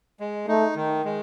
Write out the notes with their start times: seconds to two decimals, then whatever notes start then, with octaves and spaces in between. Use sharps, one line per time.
0.20 G#3
0.48 A3 D#4
0.76 D#3
1.05 G#3